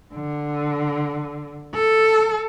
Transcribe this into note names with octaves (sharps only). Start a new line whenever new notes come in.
D3
A4